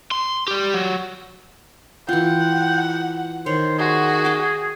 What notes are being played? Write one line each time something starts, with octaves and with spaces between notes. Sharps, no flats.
C6
G3 G4
F#3
E3 F4 F#5 G5
D#3 C5 C#5
F#4 G#4
G5 D6